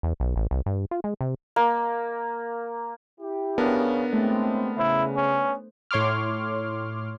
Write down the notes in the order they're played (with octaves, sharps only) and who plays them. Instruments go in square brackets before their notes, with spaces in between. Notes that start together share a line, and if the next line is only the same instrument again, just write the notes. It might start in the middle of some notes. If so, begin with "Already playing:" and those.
[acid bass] E2
B1
A1
C2
G2
F4
G#3
C3
[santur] A#3
[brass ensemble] E4 G4
[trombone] C#3 [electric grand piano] B3 D4 A#4 [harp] A5
[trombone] A2 [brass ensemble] G#3 C4 [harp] A3 A5
[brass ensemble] C#3 [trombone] E4 [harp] C5
[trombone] C#4
[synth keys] A2 C#5 C6 D6 F6